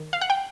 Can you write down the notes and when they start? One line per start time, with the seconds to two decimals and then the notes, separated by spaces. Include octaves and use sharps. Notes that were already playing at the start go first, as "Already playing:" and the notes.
Already playing: D#3
0.13 F5
0.21 F#5
0.30 G5